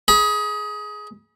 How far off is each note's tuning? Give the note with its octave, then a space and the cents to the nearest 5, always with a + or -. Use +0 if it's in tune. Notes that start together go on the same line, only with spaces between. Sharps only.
G#4 +15 B5 -40